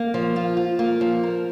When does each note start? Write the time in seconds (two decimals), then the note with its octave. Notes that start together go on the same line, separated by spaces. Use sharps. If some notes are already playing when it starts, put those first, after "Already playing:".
Already playing: A#3
0.14 F3
0.36 F4
0.57 F4
0.79 A#3
1.01 F3
1.23 A#4